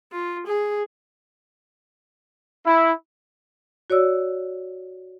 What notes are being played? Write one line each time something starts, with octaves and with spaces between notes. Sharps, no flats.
F4
G#4
E4
F#4 C#5 D5 E6